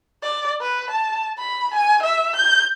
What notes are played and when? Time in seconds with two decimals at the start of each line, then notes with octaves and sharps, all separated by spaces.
0.23 D5
0.61 B4
0.90 A5
1.38 B5
1.74 G#5
2.03 E5
2.36 G6